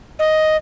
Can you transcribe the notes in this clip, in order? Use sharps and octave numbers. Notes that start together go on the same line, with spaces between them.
D#5